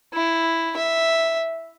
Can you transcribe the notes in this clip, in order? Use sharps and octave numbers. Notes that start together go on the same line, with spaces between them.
E4
E5